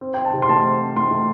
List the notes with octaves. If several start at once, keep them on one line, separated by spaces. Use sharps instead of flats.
C4
C4 G5
A5
C3
C6
A3 A5
C4
C4
A3 C6
A3